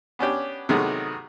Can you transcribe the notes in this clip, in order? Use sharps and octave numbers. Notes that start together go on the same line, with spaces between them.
B3 C#4 D4 G4
C3 D#3 F#3 G#3 A3 B3